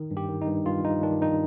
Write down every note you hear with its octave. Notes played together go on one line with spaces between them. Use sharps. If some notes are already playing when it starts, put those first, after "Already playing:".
Already playing: D#3
G2
G4
D#3
D#4
G2
G2 F4
G2 D#4
D#3 D4
D#3 D#4